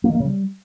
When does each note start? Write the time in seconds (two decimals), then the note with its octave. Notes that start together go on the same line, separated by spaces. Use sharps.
0.04 A#3
0.09 D#3
0.15 A#3
0.20 C#3
0.25 G3